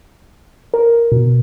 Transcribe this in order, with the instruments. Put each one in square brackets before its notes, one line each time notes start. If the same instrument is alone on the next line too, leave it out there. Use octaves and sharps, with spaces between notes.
[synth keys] A#4
B2